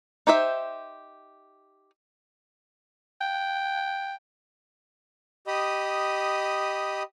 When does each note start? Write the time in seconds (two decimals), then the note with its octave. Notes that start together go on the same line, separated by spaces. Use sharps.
0.27 D#4 G4 C5 E5
3.21 G5
5.47 G4 D#5 B5 D#6